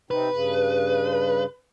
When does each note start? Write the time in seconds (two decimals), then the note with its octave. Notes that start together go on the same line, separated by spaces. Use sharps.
0.11 C3 C4 D#4 B4
0.32 G2 C#3